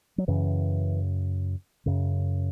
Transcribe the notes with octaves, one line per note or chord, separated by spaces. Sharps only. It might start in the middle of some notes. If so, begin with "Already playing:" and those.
F#3
F#2 C#3 E3
F#2 C#3